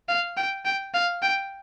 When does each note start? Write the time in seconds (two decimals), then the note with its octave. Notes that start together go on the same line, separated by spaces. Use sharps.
0.08 F5
0.37 G5
0.65 G5
0.94 F5
1.22 G5